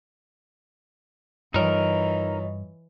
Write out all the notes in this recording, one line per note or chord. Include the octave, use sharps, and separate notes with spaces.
G2 E3 G3 D#4 F4 A#4 C#5 D#5